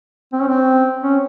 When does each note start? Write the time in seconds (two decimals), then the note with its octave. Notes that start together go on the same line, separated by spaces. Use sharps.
0.33 C4
0.41 C#4
0.48 C4
1.03 C#4